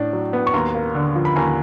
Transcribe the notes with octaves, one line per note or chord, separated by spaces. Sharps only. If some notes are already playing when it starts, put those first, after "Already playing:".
Already playing: A2 D4
F#3
B3
C#6
D#2 A#5 C6
A#3
D3
F3
B5
D#2 G#5 A#5